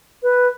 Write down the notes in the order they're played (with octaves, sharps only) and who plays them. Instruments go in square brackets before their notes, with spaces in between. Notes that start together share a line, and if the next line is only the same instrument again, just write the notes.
[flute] B4